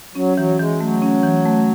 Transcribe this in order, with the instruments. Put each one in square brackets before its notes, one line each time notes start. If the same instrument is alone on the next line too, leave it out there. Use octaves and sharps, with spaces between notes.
[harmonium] F#3 [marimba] C#4
[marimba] E3 [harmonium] F#3
[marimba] E3 [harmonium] G#3
[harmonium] F#3 [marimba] A3
[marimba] C#4
E3
A3